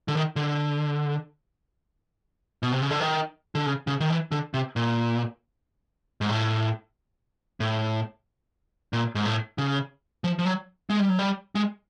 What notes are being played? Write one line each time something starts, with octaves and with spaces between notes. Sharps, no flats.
D3
D#3
D3
B2
C3
C#3
D3
D#3
D3
C#3
C#3
D#3
E3
D3
C3
A#2
G#2
A2
A2
A#2
G#2
A2
C#3
F3
F3
F#3
G#3
G3
F#3
G3
G#3